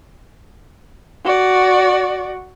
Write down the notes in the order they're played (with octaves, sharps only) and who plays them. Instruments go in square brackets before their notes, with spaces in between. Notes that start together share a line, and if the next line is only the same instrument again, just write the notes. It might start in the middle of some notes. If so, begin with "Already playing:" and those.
[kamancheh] F#4 D5